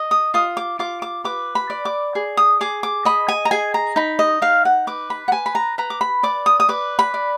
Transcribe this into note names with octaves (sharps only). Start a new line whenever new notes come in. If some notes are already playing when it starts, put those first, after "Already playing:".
Already playing: D#5
D#6
F4 D#6
D6
F4 D6
D6
B4 D6
B5
D5
D6
G#4
D#6
G#4 D6
D6
D#5 B5
G#5
A#5
G#4 G#5
A#5
D#4 B5
D#5
D#4 F5
F#5
B4 D6
B5
F#5
B4 G#5
B5
A#5
B4 A#5
D6
B5
D5 D6
D#6
D#6
B4 D6
B5
D5